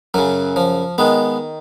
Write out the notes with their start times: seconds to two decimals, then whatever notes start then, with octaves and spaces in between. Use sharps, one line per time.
0.14 F#2 C#3 F#3
0.56 F3
0.98 D#3 G#3 B3